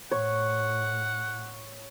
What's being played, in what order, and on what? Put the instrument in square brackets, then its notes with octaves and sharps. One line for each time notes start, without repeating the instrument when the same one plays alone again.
[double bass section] A2 [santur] C#5 [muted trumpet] F#5